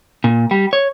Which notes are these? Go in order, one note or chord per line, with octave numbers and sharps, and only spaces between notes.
A#2
G3
C#5